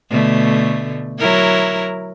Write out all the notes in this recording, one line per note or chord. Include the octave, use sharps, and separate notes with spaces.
B2 D3 A3
F#3 E4 A#4